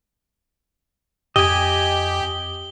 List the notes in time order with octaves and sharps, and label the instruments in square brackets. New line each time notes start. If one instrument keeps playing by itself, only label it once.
[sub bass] F2 [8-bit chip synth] G4 [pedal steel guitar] D#5 G#5 [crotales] G7